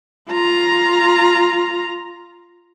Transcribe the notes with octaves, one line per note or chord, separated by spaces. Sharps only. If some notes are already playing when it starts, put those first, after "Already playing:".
F4 A#5